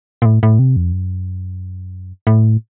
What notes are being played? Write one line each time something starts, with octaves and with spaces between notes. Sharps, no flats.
A#2
A2
A2
C3
F2
F#2
A2